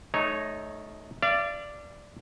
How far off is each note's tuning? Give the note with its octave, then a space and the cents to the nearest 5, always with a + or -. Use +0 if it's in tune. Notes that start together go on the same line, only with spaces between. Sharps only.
A3 -25 D#4 +0 C#5 +0
D5 +0 F5 -40